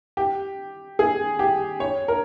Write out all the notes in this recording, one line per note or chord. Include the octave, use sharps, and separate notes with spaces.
G4
G#4
G4
C#5
A#4